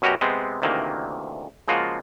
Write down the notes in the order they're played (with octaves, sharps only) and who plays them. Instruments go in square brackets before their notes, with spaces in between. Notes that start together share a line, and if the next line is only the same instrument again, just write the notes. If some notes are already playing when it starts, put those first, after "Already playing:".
[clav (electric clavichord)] F#2 B2 C#4 F#4 G4 A#5
C3 G#3 B3 C4
D2 C3 D#3 E3 A#3
C#3 F3 G#3 A#3 F4 F#4